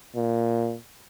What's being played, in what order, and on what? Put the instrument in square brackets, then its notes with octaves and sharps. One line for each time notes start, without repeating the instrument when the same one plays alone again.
[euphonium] A#2